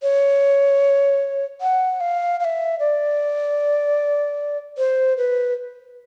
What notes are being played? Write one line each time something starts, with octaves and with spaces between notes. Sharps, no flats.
C#5
F#5
F5
F5
E5
D5
C5
B4